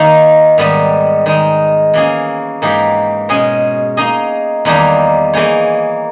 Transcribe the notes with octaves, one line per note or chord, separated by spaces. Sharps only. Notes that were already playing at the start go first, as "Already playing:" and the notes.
Already playing: D#3 A#3 D#4
G#2 D#3 G3 B3
D#3 G#3 D#4
E3 A#3 C#4 G#4
G#2 E3 A#3 D#4 G4
B2 G#3 C#4 G#4 D#5
A#3 D#4 G#4 D#5
E2 D#3 G3 A#3 D#4
E3 A#3 D#4 G#4 C#5